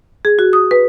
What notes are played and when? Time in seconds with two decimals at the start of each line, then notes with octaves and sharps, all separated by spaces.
0.25 G#4
0.39 F#4
0.53 D#6
0.71 B4